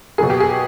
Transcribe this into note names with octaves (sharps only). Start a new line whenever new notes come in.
B2 F#3 A#3 G#4
G4
G#4